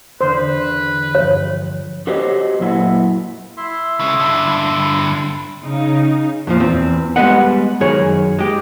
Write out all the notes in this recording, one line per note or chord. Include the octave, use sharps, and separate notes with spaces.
E2 D3 B4 C5
G2 F3 C#5
F#4 G4 C5 C#5 D#5
F#2 A#2 F#3 E4 F#4
E4 E5 C6
C#3 G#3
G2 D3
C#3 D#4
F2 A#2 F3
E2 C4
G3 G#3 B3 B4 D#5 F#5
F#2 D#3 G#4 C#5
G#3 G4